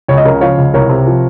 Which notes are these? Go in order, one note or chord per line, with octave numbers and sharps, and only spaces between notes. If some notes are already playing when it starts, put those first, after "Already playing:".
C#2 C#5
D#5
C#3 A#4 C#5
F3 C#5 F5
C#2
C2 A#4 C#5
C3
F3